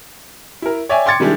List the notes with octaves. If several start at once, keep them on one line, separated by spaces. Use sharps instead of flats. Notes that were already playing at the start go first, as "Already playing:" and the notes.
E4 A#4
C#5 D5 E5 G5 G#5
G5 C6 D6 G#6 A6 C#7
D#3 G3 G#3 D4 E4 G4